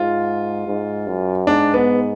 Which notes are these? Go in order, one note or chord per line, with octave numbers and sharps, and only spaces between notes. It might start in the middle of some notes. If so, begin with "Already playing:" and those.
Already playing: G#2 F4
G#2
F#2
G#2 D4
B3